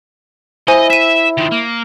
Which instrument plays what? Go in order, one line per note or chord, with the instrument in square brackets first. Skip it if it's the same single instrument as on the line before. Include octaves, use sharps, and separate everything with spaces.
[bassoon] E4 [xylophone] C5 G#5 [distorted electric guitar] D#5
[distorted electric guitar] E5 [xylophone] B6 D#7
[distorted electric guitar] D#3 F3
A#3